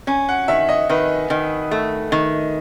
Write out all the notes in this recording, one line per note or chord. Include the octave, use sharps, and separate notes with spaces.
C#4 G#5
F#5
D#3 E5
D#5
D#3 B4
D#3
A3
D#3